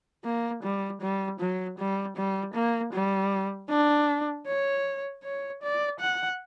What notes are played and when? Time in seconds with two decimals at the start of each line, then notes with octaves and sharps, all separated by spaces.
0.24 A#3
0.63 G3
1.01 G3
1.40 F#3
1.79 G3
2.17 G3
2.54 A#3
2.93 G3
3.70 D4
4.47 C#5
5.24 C#5
5.62 D5
6.00 F#5